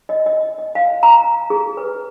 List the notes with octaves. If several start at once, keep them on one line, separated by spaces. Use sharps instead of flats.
D#5
D#5
D#5
F5
A#5
G#4
B4